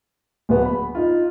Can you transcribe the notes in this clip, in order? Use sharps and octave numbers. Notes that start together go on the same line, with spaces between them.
D1 B3
B5
D#4 F4